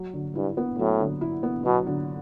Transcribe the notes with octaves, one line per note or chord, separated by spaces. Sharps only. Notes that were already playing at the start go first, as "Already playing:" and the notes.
Already playing: F#3
D3
G2 E4
B3
A2 F#3
D3
E4
B3
B2 F#3
D3